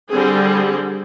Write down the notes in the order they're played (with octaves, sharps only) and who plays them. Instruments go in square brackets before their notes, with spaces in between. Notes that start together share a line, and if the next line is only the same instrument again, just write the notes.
[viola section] D3 G3 C4 G#4